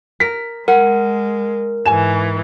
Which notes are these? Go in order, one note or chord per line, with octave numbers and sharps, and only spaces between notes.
A#4 B6
G#3 A#4 F#5
G#2 E3 G#5 E7